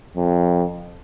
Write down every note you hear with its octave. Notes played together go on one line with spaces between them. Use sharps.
F2